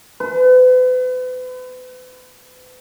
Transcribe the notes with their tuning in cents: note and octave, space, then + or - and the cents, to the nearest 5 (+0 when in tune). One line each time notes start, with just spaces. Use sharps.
B4 +40